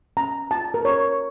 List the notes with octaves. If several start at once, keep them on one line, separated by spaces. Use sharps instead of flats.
C#4 A#5
F4 A5
A#4
C#4 C#5